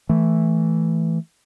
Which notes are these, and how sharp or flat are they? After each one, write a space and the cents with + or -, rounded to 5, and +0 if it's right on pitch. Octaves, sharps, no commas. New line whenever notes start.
E3 +0 A3 +0